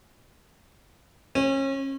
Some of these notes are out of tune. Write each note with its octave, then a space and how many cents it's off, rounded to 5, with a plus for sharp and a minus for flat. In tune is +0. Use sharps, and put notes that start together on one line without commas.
C#4 -35